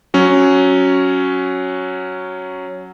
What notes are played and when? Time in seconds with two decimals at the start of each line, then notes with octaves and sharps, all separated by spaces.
0.14 F#3 C#4